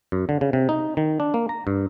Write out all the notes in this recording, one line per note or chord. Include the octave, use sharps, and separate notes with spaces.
F#2
D3
C#3
C3
D#4
D#3
D4
A#3
A#5
G2